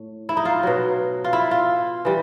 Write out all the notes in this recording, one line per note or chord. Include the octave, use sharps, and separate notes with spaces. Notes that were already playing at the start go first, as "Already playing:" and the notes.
Already playing: A2
E4
D#4
F4
B2 F#3
F4
E4
F4
E3 G3